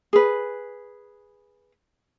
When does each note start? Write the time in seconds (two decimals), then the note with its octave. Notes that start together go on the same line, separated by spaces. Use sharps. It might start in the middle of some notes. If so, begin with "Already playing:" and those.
0.13 G#4 B4